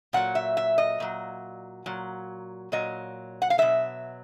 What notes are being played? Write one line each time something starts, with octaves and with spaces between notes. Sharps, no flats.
A#2 F#3 F#5
E5
E5
D#5
A#2 F#3
A#2 F#3
A#2 F#3 D#5
F#5
F5
B2 F#3 E5